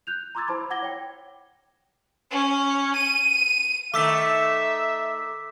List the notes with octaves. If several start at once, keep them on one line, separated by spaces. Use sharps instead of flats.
F#6 G6 F7
A#5 C6 D6 E6 G#6 A6
E4 C5 A5 B5 D6
F#5 D6 G#6 A#6 G7
C#5 G5
C#4
D#7
D#3 A3 E5 D6 E6 B6